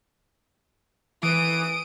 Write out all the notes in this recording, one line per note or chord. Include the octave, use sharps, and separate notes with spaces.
E3 D#6 D7